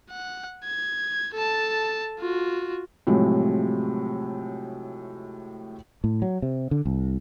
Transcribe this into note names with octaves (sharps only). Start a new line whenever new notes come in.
F#5
G#6
A4 A5
F4 F#4
A2 C3 F3 F#3 G#3
A2
F#3
C3
D3
C2